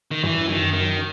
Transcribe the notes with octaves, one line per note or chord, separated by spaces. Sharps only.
D#3
G2 E3
F#2
D#3
F#2
D#3